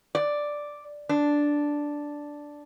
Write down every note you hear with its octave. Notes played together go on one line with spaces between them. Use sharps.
D5
D4